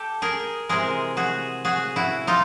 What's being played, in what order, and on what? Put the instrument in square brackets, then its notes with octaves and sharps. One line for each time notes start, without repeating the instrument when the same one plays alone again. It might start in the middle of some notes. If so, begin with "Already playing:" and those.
Already playing: [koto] G4 A4
G#4 A#4
C3 E3 G#3 G#4 A#4
F#4 G#4
F#4 G#4
E4 F#4
D#4 F4